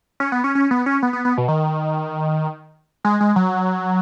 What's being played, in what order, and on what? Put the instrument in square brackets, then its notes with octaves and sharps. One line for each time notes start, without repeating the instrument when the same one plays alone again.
[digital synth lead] C#4
B3
C#4
C#4
B3
C#4
B3
B3
B3
B2
D#3
G#3
G#3
F#3